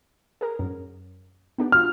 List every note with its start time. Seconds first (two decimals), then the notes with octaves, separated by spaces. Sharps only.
0.41 G#4 A#4
0.59 F#2
1.58 B3 D4 G4
1.72 F4 F#4 F6